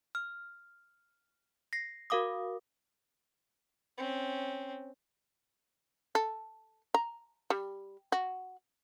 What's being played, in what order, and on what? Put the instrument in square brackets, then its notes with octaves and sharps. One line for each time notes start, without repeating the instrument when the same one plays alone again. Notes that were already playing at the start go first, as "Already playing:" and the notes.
[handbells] F6
A#6 C7
F#4 A#4 F5 D6 D#6
[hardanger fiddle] C4 C#4
[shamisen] A4
A#5
G3
F#4